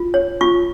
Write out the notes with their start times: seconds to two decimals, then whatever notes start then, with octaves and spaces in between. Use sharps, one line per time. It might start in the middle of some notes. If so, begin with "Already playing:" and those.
Already playing: F4
0.14 C#5
0.41 F4 C#6